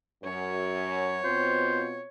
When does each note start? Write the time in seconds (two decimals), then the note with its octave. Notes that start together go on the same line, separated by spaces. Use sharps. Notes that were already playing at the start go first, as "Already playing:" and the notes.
0.24 F#2 C#5
1.24 B2 C4 F4 C5